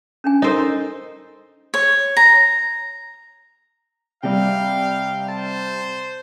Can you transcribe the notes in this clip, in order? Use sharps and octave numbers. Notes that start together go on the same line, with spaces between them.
C#4 D4 G#5
D#4 A4 A#4 C5 D#5
C#5
A#5
C3 G3 F5 G5
C5 A5